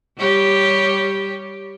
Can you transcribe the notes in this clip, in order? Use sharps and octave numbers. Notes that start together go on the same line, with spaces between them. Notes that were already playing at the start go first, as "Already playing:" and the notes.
G3 G4 C#5